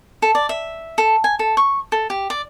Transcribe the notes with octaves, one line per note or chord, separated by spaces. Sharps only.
A4
D5
E5
A4
G#5
A4
C#6
A4
G4
D5